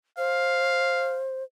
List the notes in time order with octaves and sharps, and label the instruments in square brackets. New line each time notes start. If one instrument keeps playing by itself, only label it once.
[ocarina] C5 [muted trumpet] F5